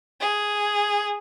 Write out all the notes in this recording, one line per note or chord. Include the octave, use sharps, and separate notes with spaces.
G#4